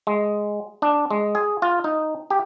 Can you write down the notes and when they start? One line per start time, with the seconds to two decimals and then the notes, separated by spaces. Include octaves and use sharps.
0.07 G#3
0.82 D4
1.11 G#3
1.35 G#4
1.62 F4
1.84 D#4
2.30 G4